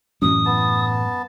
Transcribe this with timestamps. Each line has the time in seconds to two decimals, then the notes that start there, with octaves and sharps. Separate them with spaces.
0.22 F#2 A2 E3 F#3 D#6
0.45 B3 A5